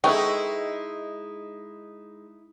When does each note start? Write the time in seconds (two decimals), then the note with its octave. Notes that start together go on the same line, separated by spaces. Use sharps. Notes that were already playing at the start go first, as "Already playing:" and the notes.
0.04 G#3 D#4 E4 A4 B4 G5 C#6